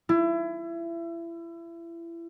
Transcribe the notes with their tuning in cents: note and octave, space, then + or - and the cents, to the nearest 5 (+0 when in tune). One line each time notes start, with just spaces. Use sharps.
E4 +30